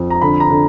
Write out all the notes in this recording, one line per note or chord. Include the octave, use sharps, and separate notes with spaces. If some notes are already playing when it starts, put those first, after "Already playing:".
Already playing: F2
A#5
D3 B5
A#5
D3